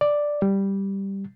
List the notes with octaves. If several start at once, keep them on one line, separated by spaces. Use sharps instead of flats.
D5
G3